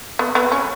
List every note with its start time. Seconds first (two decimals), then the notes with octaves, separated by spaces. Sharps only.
0.19 B3
0.35 B3
0.52 C#4